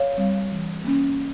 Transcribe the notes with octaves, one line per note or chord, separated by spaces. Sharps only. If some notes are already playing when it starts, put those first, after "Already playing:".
Already playing: C#5 F5
G3 C4
E3
A#3 C#4